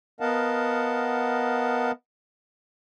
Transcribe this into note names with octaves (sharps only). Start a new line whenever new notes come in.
B3 A#4 D#5 F5 F#5 A5